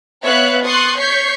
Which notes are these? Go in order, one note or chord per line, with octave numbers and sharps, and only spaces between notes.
B3 C#5 E5 F5 F#6 C#7
C6 C#6 D#6 F#6 A6
C#5 C#6 G6 B6 C7